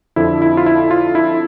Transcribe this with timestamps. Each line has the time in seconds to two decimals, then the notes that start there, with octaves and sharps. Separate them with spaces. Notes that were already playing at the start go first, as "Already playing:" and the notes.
0.16 F2 D3 F3 E4
0.42 E4
0.57 F4
0.66 E4
0.91 F4
1.15 E4